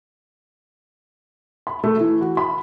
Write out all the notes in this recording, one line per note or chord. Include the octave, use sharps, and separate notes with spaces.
B5
A3
E3
F#4
B5